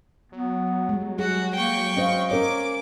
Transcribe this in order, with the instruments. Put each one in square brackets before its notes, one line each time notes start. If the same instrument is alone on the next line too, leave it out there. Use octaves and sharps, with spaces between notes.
[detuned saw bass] F#3 [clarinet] B3
[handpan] G3 G#3
[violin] F#4 [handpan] G#4 [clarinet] F#5
[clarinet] A#3 [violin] G5 C#6
[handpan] C#4 C5 F5 [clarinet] D#5
[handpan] C#4 A#4 C#5 [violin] D6